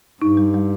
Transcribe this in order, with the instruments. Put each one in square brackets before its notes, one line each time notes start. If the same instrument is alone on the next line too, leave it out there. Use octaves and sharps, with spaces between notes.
[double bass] G2 [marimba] D#4
[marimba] G3
G3